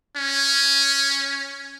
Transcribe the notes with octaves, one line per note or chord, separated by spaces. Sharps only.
C#4